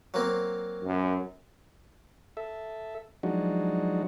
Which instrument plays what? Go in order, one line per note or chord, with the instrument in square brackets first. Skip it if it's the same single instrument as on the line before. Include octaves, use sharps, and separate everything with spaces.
[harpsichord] F#3 A#3 C4
[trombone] F#2
[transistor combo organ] A4 E5
F3 F#3 G#3 D4 D#4 F#4